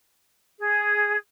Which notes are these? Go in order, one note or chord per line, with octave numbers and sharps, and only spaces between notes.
G#4